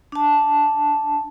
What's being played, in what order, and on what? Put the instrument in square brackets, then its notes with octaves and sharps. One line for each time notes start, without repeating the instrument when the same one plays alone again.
[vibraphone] D4 A5